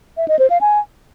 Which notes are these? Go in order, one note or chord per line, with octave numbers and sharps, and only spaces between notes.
E5
D#5
C5
F5
G#5